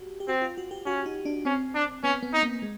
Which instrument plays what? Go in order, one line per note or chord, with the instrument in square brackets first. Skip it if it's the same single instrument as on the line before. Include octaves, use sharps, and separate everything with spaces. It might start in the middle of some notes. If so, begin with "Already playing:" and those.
Already playing: [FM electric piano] F#4 G4
G4
[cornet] C4 [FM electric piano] F#4
[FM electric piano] F4
F#4
G4
[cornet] C#4 [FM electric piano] F#4
[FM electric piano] D#4
D4
[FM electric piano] C4 [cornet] C#4
[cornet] D4
[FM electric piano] B3 [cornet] C#4
[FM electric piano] B3
[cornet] D#4
[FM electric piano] A#3
G#3